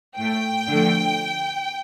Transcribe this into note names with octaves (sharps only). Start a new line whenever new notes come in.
A2 A3 G5
D3 F3 A3